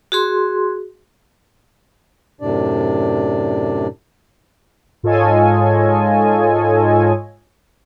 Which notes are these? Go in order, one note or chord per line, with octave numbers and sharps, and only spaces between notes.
F#4 G#4 C6
F#2 A2 C3 D4 D5
G#2 F4 A4 C#5 D#5 G#5